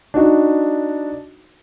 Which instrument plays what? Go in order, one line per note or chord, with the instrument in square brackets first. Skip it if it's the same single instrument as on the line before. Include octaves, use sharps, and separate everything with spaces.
[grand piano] D4 D#4 F#4